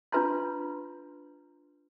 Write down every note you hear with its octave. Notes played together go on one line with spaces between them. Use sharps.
D4 F4 B4 A#5 C6